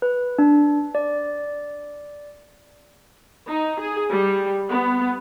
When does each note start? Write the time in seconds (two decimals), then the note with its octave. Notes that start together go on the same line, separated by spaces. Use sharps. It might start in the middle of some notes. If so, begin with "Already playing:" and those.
0.02 B4
0.39 D4
0.95 D5
3.49 D#4
3.80 G#4
4.11 G3
4.69 B3